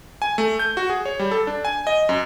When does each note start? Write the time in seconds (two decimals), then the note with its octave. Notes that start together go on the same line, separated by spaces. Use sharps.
0.22 G#5
0.38 A3
0.59 G6
0.77 F#4
0.90 G#4
1.06 C#5
1.19 G3
1.31 A4
1.47 D4
1.65 G#5
1.87 D#5
2.09 F#2